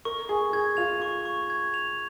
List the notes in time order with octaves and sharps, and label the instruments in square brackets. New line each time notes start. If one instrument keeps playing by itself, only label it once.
[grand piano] A#4 [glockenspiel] C#6
[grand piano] G#4 [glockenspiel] C#6
[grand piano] G#4 [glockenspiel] G#6
[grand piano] F4 [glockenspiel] F7
[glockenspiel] C#6
C#6
G#6
F7